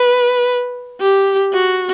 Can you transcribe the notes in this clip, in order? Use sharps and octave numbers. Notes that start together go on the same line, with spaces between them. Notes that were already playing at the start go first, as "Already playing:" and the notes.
Already playing: B4
G4
F#4